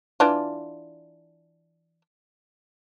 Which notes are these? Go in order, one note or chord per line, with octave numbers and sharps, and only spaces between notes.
E3 D4 F4